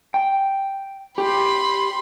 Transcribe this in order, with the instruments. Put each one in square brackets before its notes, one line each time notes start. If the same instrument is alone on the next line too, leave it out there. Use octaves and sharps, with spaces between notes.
[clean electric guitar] G5
[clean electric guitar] G4 [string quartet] B5 C6